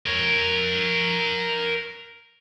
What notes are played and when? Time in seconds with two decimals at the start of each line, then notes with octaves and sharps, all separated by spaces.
0.06 A#4 C#5